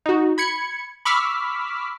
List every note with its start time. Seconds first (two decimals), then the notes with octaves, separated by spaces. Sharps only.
0.06 D#4 F#4
0.38 B5 G#6 C#7
1.05 B5 C#6 D6 E6 F6 B6